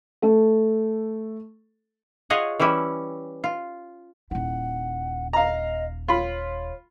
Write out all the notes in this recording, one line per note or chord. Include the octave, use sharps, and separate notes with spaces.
A3 A4
F4 G#4 C#5 D#5 F5 F#5
E3 G3 C#4 E4
F4
D#1 E4 F#5
D#5 F5 A#5
F4 C#5 B5